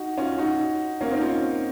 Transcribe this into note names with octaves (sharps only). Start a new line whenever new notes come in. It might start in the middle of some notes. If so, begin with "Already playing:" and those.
Already playing: D#4 F#4
C#4 F4
D#4 F#4
A#3 C#4
C4 D#4
C#4 F4